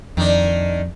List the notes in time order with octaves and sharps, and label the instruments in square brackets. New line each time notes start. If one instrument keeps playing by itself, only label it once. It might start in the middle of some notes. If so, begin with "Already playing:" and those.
[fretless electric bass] F2 [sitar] D#3 D4